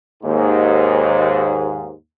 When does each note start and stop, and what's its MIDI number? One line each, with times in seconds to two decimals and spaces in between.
0.23 1.91 39
0.23 1.91 44